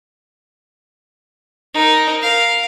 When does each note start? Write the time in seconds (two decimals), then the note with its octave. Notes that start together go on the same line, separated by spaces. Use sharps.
1.74 D#4 A#4
2.22 A#4 F5